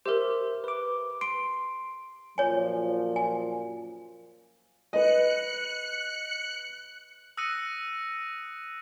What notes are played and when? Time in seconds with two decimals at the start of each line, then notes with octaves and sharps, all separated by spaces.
0.06 G4 A#4 C5 E5
0.64 B4 D6
1.21 C6 D7
2.38 F#2 A#2 F3 C#5 G#5
3.16 G#5
4.93 B4 D#5 F#6 C#7
7.37 D#6 E6 F#6 A#6 C#7 D#7